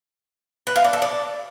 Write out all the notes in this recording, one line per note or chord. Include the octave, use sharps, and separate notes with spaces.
B4
F5
D4
A4
D5